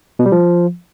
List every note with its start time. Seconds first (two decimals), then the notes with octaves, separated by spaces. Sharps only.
0.19 B2
0.26 G3
0.32 F3